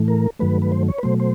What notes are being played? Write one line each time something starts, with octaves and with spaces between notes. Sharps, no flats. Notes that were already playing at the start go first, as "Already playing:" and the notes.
Already playing: A2 E3 A3
A#4
G2 D#3 F#3 A3 B4
B4
C5
C#5
B4
B2 F#3 A3 C5
C5